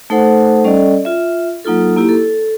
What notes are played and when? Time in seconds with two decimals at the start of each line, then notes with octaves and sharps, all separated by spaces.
0.10 A3 D#4 A4 C5 F#5
0.64 G3 C#4 A4 D5 D#5
1.05 F4 E5
1.65 F#3 A#3 D#4 F4 A4
1.97 A#3 E4 G4
2.09 A4